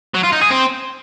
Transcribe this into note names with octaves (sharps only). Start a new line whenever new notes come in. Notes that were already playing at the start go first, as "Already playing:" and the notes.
F#3
F4
D#4
G#4
C4